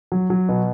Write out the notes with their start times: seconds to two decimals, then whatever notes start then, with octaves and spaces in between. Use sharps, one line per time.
0.12 F#3
0.30 F#3
0.49 B2